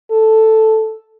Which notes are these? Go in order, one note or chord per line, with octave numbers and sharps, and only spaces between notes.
A4